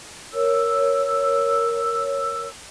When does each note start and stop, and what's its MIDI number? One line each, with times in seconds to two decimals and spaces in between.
0.33 2.46 70
0.33 2.46 73
0.33 2.46 88